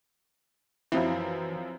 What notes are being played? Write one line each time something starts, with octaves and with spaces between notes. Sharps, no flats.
F#2 E3 F3 C4